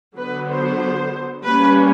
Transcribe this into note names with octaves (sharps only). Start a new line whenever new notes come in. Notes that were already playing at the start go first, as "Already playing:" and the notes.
D3 F#3 B3 B4
C5
G3 A#3 C#4 B4